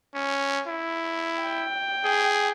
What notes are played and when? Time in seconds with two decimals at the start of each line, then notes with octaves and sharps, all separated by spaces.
0.14 C#4
0.68 E4
1.41 G5
2.04 G#4